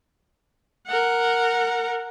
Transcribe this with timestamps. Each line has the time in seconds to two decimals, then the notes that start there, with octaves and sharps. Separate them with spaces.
0.87 A#4 F#5